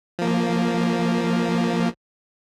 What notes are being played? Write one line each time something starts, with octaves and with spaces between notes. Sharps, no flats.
F3 A#3